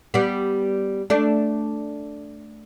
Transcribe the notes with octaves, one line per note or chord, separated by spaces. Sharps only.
G3 B3
A3 D4